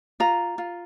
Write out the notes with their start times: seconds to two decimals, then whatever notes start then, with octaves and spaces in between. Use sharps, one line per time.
0.20 F4 A#5
0.58 F4